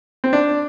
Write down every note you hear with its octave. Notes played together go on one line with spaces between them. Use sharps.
C4
D4